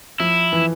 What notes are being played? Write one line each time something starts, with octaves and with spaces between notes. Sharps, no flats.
F3 E4
E3